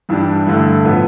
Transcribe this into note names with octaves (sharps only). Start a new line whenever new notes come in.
G2 E3 G3 D4 G4
G2 D3 A3 E4
A2 F3 B3